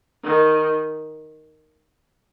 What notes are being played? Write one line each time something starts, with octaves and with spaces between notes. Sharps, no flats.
D#3